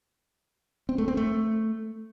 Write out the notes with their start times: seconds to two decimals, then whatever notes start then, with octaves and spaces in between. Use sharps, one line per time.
0.89 C4
0.98 A3
1.08 C4
1.17 A3